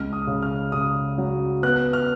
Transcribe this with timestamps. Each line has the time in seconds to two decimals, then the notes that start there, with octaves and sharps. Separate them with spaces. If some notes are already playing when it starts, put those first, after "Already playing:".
Already playing: C#2 F6
0.13 D#6
0.27 C#3
0.42 F6
0.72 C#3 D#6
1.18 F#3
1.63 B3 F#6
1.93 F6